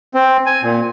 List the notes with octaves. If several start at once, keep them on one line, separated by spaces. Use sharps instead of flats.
C4
G#5
A#2